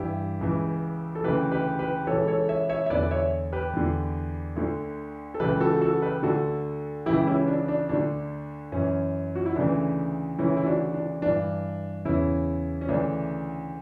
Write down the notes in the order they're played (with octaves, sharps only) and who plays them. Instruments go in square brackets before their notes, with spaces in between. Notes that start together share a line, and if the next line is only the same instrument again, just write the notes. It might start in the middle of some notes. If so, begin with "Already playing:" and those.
Already playing: [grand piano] G2 E3 E4 G4
C#2 C#3 E3
A4
D2 C#3 E3 G4 B4
G4 B4
G4 B4
C#2 C#3 E3 A4 C#5
A4 C#5
C#5 E5
C#5 E5
E5
E2 D3 B4 D5
C#5 E5
G4 B4
E2 D3
D2 D3
A4
C#2 C#3 E3 G4 B4
F#4 A4
F#4 A4
G4 B4
D2 D3 F#4 A4
C#2 C#3 E3 E4 G4
C#4 E4
D4
D4
D2 D3 D4
F#2 E3 C#4
F#4
E4
D2 C#3 E3 D4
D2 C#3 E3 C#4 E4
E4
D4 F#4
D4
G2 E3 D4
E2 C#3 E3 C#4 E4
C#4
D2 C#3 E3 D4